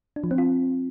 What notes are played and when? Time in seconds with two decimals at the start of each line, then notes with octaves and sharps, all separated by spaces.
0.16 D4
0.24 F3
0.31 C4
0.38 F4